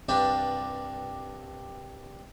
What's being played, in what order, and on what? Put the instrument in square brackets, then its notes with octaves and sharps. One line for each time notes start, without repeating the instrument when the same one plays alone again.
[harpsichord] C2 G2 D4 F4 B4 G5